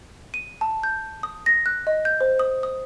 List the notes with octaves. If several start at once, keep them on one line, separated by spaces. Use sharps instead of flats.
D#7
A5
G6
D#6
A#6
F#6
D#5
G6
C5
D#6
D#6